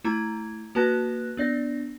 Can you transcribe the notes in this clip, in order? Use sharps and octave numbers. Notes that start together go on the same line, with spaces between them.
A3 E4 A#5 G#6
A#3 F#4 B4 A5 F#6 A#6
B3 D4 D5 A#6